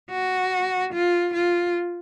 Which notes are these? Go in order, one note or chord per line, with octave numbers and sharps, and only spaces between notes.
F#4
F4
F4